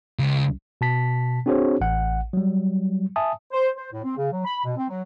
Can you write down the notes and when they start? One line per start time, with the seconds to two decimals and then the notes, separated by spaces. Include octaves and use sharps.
0.19 C#2
0.81 B2 A5 B6
1.46 C4 D4 F#4 G#4 C5 C#5
1.81 A1 F#5
2.33 F#3 G3
3.16 E5 G#5 A5 D#6
3.52 C5
3.76 C5
3.92 A2
4.04 C4
4.16 C#3
4.31 F#3
4.45 B5
4.63 B2
4.76 C4
4.89 F#3